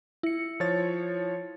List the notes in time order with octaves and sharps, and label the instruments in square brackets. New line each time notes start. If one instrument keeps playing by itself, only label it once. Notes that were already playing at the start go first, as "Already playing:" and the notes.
[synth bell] E4 C#7
[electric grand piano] F3 C#5 A6